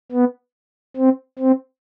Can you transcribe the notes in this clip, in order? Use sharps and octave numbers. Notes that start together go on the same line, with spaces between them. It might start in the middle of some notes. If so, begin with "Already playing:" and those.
B3
C4
C4